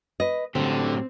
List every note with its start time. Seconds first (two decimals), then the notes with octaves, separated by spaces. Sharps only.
0.20 B4 D#5
0.55 A2 D3 F#3 C4 G4